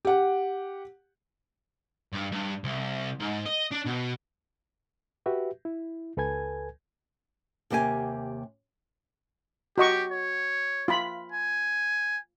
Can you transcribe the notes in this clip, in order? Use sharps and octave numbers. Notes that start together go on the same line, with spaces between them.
G4 F#5
G2
G2
C2
G#2
D#5
D4
B2
F#4 G4 B4 E5
E4
C#2 A4 B4 G#5 G#6
D#2 C3 A#3 G4 A#4 G#5
F#4 G4 D#5 C#6
C#5
F4 B5
G#5